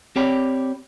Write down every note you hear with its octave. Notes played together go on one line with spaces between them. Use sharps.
C4 G4 C#5 D5 G5 B5